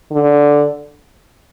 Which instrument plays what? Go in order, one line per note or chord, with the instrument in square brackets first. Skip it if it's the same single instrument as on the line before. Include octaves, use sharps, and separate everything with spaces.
[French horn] D3